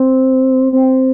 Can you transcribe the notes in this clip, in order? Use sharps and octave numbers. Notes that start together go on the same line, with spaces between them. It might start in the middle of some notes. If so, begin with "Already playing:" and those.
Already playing: C4
C4